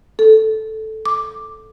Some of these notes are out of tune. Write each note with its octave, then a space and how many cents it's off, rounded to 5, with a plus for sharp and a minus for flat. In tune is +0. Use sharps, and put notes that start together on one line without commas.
A4 -5
D6 +5